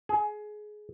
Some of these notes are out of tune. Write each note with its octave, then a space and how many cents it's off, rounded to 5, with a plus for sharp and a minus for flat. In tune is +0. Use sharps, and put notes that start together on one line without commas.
G#4 +20